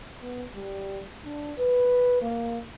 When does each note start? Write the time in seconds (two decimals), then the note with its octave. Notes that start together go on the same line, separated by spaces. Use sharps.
0.21 B3
0.55 G3
1.25 D4
1.59 B4
2.21 A#3